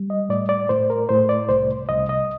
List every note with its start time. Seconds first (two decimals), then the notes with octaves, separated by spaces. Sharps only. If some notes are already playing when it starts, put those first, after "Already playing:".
Already playing: G3
0.10 D#5
0.29 A2 D5
0.49 D5
0.69 A2 C5
0.90 A#4
1.09 A2 C5
1.29 D5
1.49 C2 C5
1.89 C2 D#5
2.09 D#5